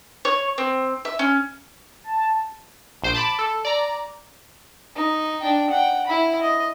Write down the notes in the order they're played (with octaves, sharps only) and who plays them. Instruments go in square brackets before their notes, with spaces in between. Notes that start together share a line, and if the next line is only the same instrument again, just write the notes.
[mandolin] C#5
C4
E5
C#4
[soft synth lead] A5
[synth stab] A#1 C5 D7
A5 B5 D6
A4
D5 A#5
[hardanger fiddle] D#4
D4 G5
F#5 G5
E4 B5
D#5